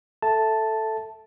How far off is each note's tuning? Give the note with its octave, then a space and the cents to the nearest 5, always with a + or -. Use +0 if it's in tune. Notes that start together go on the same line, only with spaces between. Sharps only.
A4 +0 E5 -5 A5 +0